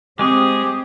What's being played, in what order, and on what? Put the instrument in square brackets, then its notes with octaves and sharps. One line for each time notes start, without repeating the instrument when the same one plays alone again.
[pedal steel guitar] G#3 G#4 C#6 [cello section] C4 [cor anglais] G4 [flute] D#6